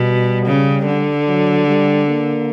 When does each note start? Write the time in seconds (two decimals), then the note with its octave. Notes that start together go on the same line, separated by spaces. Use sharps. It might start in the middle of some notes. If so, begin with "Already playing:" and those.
Already playing: B2 G3
0.46 C#3
0.86 D3
1.27 F#3
1.67 G3
2.07 A#3